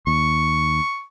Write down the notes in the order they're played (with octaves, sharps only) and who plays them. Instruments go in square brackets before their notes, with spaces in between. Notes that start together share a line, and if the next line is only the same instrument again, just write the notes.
[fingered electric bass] D#2 [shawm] C#6